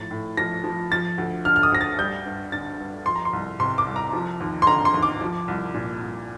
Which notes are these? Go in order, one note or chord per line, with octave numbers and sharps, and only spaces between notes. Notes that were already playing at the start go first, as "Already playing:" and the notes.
Already playing: A2 F3 A6
A2
F3 A#6
F3
F3 A6
D2
D3 F6
F6
D#6
D2 A#6
A6
G3 G6
G2
D3 A6
G2
F3 C6
A#5
C6
C2
C3 C6
D6
C2
A#5
F3
D#2
C6
D3 A#5
C6
D#2
D6
F3
C2
A#2
C2